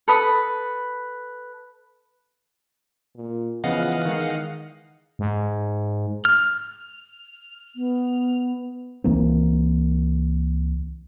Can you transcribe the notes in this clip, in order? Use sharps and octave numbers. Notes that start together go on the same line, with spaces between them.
A4 B4 B5 D#6
A#2
C#3 E3 F3 B3 D#5 F5 F#5
D#3 G#3
G#2
F6
B3
C#2 E3 A#3 C4